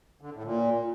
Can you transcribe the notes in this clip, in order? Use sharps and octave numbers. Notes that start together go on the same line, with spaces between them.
D3
A2
A#2